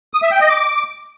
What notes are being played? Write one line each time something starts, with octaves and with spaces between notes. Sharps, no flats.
D#6
E5
G5
D#5
D6